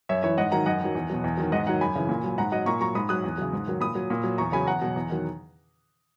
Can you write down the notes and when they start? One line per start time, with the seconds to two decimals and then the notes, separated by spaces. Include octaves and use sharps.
0.09 F#2 C#5 E5
0.23 E3 C#5 E5
0.37 G#2 D#5 F#5
0.52 D#3 F#3 F#5 A#5
0.66 F#2 D#5 F#5
0.81 D#3 F#3
0.95 E2
1.10 B2 F#3
1.24 E2
1.37 D#3 F#3
1.52 G#2 D#5 F#5
1.66 D#3 F#3 F#5 A#5
1.81 F#2 G#5 B5
1.95 C#3 E3
2.09 A#2
2.24 F#3
2.38 G#2 F#5 A#5
2.52 F#3 D#5 F#5
2.66 A#2 A#5 C#6
2.81 F#3 A#5 C#6
2.95 G#2 B5 D#6
3.09 F#3 D#6 F#6
3.24 E2
3.38 C#3 F#3
3.53 G#2
3.67 D#3 F#3
3.81 A#2 B5 D#6
3.95 F#3
4.10 A#2
4.24 F#3
4.38 E2 A#5 C#6
4.52 C#3 F#3 G#5 B5
4.67 E2 F#5 A#5
4.81 B2 F#3
4.96 E2
5.10 D#3 F#3